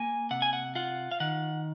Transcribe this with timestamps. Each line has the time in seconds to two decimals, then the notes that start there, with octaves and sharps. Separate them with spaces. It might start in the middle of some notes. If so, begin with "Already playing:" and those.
Already playing: A#3 G#5
0.31 C3 F#5
0.42 G#5
0.53 F#5
0.75 F4 F#5
1.11 F5
1.20 D#3 F#5